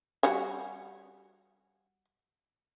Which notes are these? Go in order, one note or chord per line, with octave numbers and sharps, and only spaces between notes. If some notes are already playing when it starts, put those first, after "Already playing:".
G3 F#4 G#5